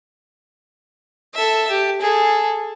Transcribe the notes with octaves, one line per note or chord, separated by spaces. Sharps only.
A4 E5
G4
G#4 A4